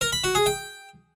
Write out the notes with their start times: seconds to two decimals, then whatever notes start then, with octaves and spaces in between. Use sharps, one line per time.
0.01 A#4
0.12 B5
0.24 F#4
0.35 G#4
0.46 G5